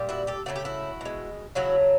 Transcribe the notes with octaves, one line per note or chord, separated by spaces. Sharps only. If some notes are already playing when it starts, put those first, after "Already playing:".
Already playing: A#2 G3
E4 F#4
G4 A4
C#3 E3 A3 F#4
G4
E4 F#4
B2 G#3
C#3 F#3 A3 E4 F#4